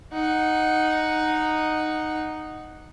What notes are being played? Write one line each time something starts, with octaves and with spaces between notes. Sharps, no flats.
D#4 F#5